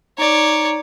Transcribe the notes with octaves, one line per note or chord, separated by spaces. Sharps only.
D#4 C#5 D5 A#5